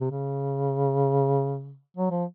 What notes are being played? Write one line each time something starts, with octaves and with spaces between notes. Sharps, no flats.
C3
C#3
F#3
F3